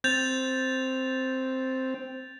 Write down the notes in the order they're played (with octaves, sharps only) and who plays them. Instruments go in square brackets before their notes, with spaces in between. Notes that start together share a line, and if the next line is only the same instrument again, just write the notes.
[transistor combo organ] C4 [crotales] G6 A6 F7